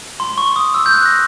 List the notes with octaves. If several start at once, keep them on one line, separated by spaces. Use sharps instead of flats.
C6
C6
C#6
D#6
E6
G6
F#6
A#6